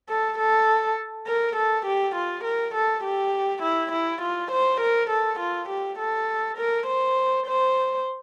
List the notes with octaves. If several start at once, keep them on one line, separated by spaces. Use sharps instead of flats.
A4
A4
A#4
A4
G4
F4
A#4
A4
G4
E4
E4
F4
C5
A#4
A4
F4
G4
A4
A#4
C5
C5